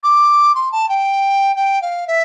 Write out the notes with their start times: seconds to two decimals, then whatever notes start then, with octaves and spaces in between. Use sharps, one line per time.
0.03 D6
0.55 C6
0.72 A5
0.89 G5
1.56 G5
1.82 F5
2.07 E5